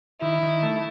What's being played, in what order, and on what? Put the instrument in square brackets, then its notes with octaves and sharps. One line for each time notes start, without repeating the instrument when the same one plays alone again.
[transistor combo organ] D#3 [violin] E4
[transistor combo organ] D#3
A3